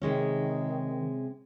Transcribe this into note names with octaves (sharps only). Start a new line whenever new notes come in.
C3 D#3 G#3 C#4